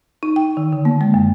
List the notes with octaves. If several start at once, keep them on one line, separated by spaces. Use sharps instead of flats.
D#4
G5
D#3
D3
A#3
G#3
F#2